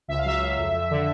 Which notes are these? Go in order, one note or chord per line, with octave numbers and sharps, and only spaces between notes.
C#2 E5
F5
F#3 E5
C#2
F2
F2
D3